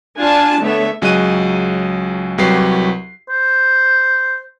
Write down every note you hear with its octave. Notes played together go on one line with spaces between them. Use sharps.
D4 F4 D5 G#5 A5
D3 A3 B3 C#5 E5
C#2 F#3 G#4 D#5 F#6 D#7
C2 F#3 G4 B4 C7
C5